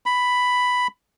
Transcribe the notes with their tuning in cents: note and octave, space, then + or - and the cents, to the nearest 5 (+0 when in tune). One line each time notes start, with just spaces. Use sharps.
B5 +5